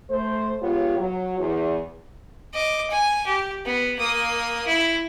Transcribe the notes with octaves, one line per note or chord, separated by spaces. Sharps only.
A3 C5
G#3 B3 F4 G4 C#5
F#3
E2
D#5 D6
G#5
G4
B3
A#3 D#6
E4